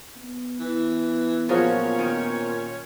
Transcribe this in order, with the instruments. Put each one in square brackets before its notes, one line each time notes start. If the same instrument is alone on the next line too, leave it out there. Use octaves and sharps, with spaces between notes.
[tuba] B3
[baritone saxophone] E3
[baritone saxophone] A#2 [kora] F3 F#3 G#4 [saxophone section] C#4 C#5
[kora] D#3